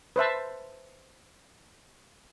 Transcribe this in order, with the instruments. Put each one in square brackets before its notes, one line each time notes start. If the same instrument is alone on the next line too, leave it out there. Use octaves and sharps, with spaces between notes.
[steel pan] B4 C5 E5 A5